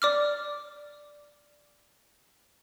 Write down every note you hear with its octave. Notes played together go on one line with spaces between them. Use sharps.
D5 D6 F6